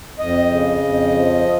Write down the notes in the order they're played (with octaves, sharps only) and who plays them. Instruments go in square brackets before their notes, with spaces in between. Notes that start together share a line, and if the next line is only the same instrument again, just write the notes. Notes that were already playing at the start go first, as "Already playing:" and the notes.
[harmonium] F2 D#5
C#3
F2
F3